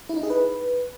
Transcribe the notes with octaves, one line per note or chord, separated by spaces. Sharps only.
E4
D#4
G#4
B4